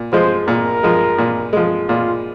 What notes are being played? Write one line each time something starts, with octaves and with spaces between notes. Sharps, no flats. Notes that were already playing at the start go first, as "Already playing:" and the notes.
Already playing: A#2
F3 G#3 C5
A#2 A#4
F3 G#3
A#2
F3 G#3
A#2 F4